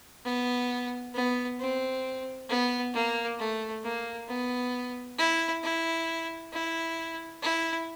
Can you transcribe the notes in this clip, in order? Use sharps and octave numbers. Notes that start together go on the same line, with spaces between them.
B3
B3
C4
B3
A#3
A3
A#3
B3
E4
E4
E4
E4